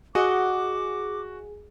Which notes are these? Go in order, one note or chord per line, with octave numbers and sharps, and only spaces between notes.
F#4 G#4 D#5 F#5 D6